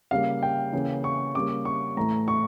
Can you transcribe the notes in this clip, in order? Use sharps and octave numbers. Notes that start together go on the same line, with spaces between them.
C#3 G3 A#3 F5
G5
C#3 E3 A#3
C#6
C#3 G3 A#3 D6
C#6
A2 E3 A3 A#5
C#6